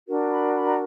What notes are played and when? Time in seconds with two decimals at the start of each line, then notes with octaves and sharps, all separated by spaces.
0.08 D4 F#4 A#4
0.30 B5
0.54 B5
0.65 A#5